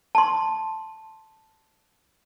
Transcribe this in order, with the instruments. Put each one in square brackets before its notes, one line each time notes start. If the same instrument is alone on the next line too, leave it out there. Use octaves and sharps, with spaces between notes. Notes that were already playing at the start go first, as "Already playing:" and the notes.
[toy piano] A5 C6